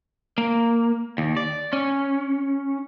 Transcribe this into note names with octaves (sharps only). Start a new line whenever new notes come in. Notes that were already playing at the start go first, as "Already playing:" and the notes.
A#3
D#2
D5
C#4